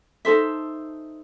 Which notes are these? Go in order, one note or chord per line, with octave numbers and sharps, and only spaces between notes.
D#4 A4 C5 E5